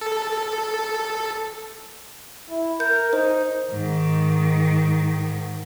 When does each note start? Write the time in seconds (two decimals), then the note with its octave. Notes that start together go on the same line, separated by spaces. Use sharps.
0.01 A4
2.50 E4
2.80 A#4 G6
3.13 D#4 C5
3.71 G#2 D#3